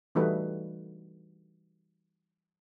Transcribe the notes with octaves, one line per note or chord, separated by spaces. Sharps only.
E3 G3 A3 D#4 F#4 B4